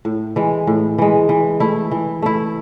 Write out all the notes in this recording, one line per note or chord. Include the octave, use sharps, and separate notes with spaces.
A2
E3 G#3
A2
E3 G#3
E3
A3 E4
E3
A3 E4